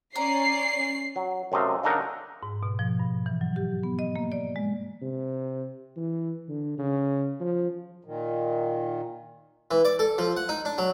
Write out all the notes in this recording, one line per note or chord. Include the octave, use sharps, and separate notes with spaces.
C#4 D5 A#5 C7
F#3
F#2 C3 A3 D#5 F5
C#3 D4 D#4 A4 A#4 F#5
G#2
B2
F3
G2
E3
F#3
G4
B3
D#5
A#3
D5
G#3
C3
E3
D3
C#3
F3
A#2 D#3
E3
D5
A4
F3
F#5
D#4
D4
F#3